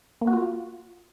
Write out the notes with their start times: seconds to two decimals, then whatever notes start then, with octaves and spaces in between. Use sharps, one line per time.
0.21 A#3
0.27 F#4
0.33 F4